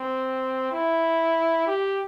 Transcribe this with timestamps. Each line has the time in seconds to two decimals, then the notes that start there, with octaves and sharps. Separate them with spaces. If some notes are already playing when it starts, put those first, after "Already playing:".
Already playing: C4
0.72 E4
1.67 G4